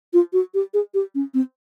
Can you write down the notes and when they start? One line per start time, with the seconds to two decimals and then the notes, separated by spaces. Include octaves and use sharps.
0.13 F4
0.33 F#4
0.54 G4
0.74 G#4
0.94 G4
1.15 C#4
1.34 C4